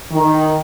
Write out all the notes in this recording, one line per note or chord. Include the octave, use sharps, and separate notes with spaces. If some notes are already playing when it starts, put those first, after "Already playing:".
D#3